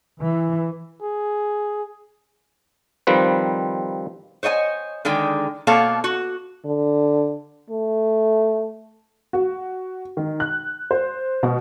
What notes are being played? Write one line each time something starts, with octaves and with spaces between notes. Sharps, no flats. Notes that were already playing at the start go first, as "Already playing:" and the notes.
E3
G#4
D#3 F3 G3 C4 B4
C5 C#5 D#5 G5 G#5
D3 D#3 G#3 G5
B2 A#3 A4 C#5 F5 A5
F#4
D3
A3
F#4
D#3
F#6
C5
B2